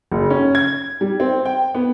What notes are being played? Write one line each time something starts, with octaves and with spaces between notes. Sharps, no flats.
F#1
C#4
G#6
G3
C4
G5
B3